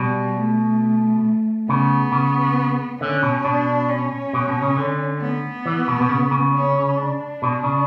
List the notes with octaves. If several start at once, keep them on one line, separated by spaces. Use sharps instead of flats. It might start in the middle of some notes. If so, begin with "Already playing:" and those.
Already playing: B2 G3
A3
C#3 B3
C#3
D3 C#4
B2
B2 D4
C#4
B2
B2
C#3
D3
B3
E3
B2
B2
C#3
C#3
C#4
D4
B2
C#3